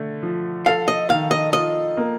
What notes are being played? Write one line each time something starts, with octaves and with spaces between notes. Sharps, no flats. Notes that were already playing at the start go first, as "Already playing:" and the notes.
Already playing: D3 A3
F3
A4 F5
D#5
D#3 F5
D#5
F4 D#5
A#3